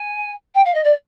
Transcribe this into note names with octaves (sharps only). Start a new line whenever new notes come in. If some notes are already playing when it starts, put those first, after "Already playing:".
Already playing: G#5
G5
F5
D#5
D5